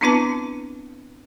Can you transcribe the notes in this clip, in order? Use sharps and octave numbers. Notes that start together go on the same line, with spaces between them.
B3 C4 D4 E4 B4 A5